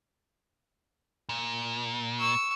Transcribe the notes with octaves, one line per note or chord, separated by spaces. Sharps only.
A#2
C#6 E6